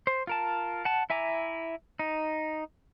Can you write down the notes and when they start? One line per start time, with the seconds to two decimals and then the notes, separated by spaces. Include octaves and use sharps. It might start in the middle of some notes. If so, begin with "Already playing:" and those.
0.07 C5
0.27 F4 A#4 A5
0.85 F#5 A5
1.10 E4 E5 G#5 A#5 D6
1.99 D#4